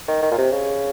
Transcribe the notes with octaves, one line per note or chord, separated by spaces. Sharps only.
D#3
D#3
A#2
C3
C#3